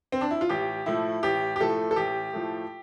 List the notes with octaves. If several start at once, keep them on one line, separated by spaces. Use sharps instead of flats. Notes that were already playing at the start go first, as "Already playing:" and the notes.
C4
D4
E4
F4
A1 G4
A2 F3 A3 E4
A1 G4
G4
A2 F3 A3 A4
A4
A1 G4
A2 F3 A3